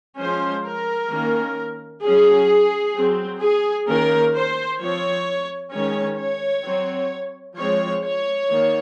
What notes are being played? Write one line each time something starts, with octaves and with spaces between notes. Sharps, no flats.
F3 G#3 C#4 C5
A#4
D#3 A#3 C#4
F#3 C#4 G#4
F#3 C4
G#4
D#3 A#3 C#4 A#4
C5
F3 C4 C#5
D#3 G#3 C#4 C#5
C#5
F#3 C4
F3 G#3 C4 C#5
C#5
D#3 A#3